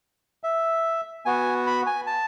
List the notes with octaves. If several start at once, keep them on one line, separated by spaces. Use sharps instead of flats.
E5
B3 F#4 G#5
B5
G#5
A5